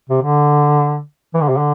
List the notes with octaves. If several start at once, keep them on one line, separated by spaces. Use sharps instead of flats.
C3
D3
E3
D3
C3
D3